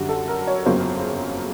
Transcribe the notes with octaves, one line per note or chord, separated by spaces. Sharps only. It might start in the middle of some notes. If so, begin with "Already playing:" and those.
Already playing: F#2 D3 G3 F#4
A4
A#4
C#5
G1 F2 C#3 F#3 A#3 C5